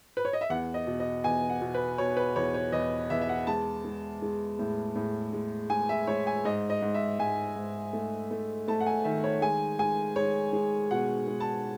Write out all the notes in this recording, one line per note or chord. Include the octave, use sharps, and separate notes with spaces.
B4
C#5
D#5
E5
E2 F#5
D#5
B2
D#5
E2 G#5
F#5
B2
B4
B2 C#5
B4
E2 C#5
C#5
E2 D#5
E2 E5
E5
F#5
G#3 A5
G#3
G#3
A2
A2
G#3
G#3 G#5
E5
G#3 C#5
G#5
G#2 D#5
D#5
G#2
E5
G#2 G#5
G#2
A3
A3
A3 A5
F#5
G#5
D#3 E5
C#5
G#3 G#5
G#3 G#5
G#3 C#5
G#3
B2 F#5
G#3
A5